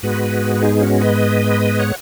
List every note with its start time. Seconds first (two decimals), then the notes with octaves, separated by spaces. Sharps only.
0.03 G#2 G#3 B3 F#4 B4
0.56 B4
0.62 D#4 G#4
0.81 C#4 F#4
1.01 B4 D#5
1.80 C#5 F#5